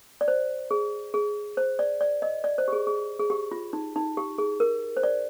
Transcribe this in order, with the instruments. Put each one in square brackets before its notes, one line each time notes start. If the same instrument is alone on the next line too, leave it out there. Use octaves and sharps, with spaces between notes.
[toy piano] D5
C5
G#4
G#4
C5
D5
D5
D#5
D5
C5
G4
G#4
G#4
G#4
G4
F4
D#4
D#4
G4
G#4
A#4
C5
D5